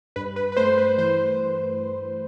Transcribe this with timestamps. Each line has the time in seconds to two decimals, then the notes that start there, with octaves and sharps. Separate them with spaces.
0.16 G2 B4
0.36 B4
0.52 B4
0.57 A3 C5
0.78 B4
0.98 E3 C5